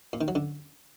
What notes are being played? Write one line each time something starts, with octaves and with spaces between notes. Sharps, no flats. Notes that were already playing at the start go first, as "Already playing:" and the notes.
A#2
D#3
F#3
D3